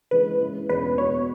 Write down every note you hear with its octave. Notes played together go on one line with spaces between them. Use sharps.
C#3 E3 G#3 B4
C#3 G#3 E4
E2 B2 G#3 C#4 B4
B2 B3 F#4 C#5